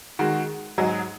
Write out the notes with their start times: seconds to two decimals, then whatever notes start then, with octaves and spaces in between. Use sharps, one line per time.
0.19 D#3 G#3 F#4
0.78 G#2 F#3 D#4 G#4